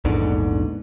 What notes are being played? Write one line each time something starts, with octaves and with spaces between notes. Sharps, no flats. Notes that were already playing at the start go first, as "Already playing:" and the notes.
A#1 E2 G#2 D3